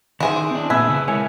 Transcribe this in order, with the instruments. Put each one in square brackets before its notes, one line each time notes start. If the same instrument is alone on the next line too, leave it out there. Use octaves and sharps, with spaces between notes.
[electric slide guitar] D#3 [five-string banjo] E4 G#4 C5
[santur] D6
[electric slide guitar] C4 D4
[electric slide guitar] A#2 A3 C4 [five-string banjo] G#4 [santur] B4 E5 G#5
[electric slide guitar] C#3 E4
[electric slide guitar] G#3 A#4 C#5 [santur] G#5